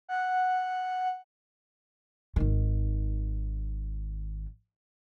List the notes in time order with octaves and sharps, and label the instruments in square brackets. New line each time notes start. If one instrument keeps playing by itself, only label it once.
[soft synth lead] F#5
[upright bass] G#1 D#3